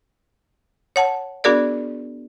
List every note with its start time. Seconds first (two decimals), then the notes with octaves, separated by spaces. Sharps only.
0.96 C#5 F#5 A5
1.44 B3 D4 F#4 G#4 A#4 D5